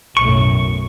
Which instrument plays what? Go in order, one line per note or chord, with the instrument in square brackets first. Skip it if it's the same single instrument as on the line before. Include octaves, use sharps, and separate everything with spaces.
[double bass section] B1 F#2 A2 [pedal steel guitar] C#6